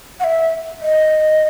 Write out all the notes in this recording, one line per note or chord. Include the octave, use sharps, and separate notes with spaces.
F#5
E5
D#5